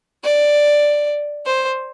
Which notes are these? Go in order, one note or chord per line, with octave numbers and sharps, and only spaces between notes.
D5
C5